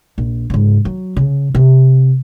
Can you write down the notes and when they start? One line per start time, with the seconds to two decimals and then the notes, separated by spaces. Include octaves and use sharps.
0.18 A#1
0.50 G#2 C#3
0.85 F#3
1.17 C#3
1.55 C3